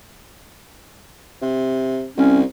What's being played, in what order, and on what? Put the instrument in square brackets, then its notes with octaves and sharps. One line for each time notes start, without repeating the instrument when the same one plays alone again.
[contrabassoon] C3
[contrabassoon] C2 [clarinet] C#4